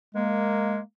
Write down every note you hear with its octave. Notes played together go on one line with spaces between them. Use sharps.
G#3 A#3